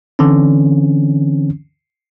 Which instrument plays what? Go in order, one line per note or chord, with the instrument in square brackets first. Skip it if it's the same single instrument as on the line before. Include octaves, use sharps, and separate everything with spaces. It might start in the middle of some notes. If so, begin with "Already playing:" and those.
[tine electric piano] D3 E3 C4 C#4